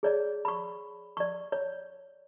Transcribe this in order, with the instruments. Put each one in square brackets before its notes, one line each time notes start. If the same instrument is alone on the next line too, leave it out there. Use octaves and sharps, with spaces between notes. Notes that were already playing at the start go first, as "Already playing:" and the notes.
[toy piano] G#4 C#5 D5
B5 C#6
D5 C#6
C#5